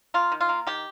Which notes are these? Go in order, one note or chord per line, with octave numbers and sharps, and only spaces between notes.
A#3 F4
D#3
F4
A#3
D#3 G4